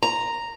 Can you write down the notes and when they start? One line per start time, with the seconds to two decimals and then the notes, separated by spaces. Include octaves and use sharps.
0.03 A#5